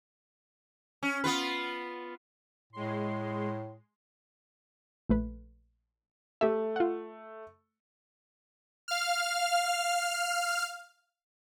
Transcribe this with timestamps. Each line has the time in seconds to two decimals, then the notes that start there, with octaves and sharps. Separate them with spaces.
1.03 C#4
1.24 B3 F4 B4
2.73 A2 G#3 C6
5.09 A#1 A3 B4
6.41 A3 G4 E5
6.76 F4 F#5
8.88 F5 F6